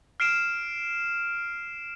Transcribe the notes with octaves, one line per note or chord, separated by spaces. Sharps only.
F6 C7 D7 E7